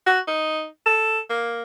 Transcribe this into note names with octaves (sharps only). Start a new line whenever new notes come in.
F#4
D#4
A4
A#3